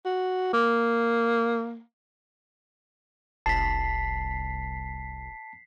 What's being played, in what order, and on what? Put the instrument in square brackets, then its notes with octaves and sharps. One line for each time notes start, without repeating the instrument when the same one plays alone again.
[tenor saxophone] F#4
A#3
[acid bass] F1 [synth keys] C2 [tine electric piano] A5 [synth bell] B6 C7